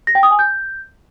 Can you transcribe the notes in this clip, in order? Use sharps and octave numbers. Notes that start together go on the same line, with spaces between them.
A#6
G5
D#6
G#5
G6